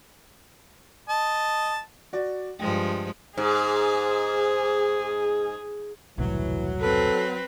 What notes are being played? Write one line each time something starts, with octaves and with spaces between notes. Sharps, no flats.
D#5 A5
F#4 D5
G2 F3 G#3 G5
G#2 G#4
E1 C2 A2 E3 F#3
C4 A4 B4